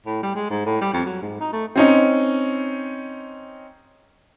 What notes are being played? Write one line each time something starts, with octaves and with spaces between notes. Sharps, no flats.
A2
G3
G#3
G#2
A2
G3
F2
F#3
G#2
D#4
A3
C4 C#4 D#4